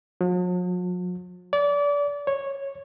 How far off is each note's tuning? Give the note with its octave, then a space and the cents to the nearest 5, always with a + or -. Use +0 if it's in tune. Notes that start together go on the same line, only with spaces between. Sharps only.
F#3 -45
D5 -30
C#5 -10